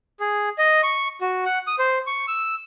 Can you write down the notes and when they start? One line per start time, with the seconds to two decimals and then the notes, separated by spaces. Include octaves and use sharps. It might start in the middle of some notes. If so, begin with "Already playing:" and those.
0.20 G#4
0.58 D#5
0.83 C#6
1.21 F#4
1.46 F#5
1.67 D#6
1.79 C5
2.07 C#6
2.28 E6